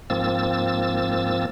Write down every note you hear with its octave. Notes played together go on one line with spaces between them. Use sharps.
G#2 F3 A#3 C4 E6 A6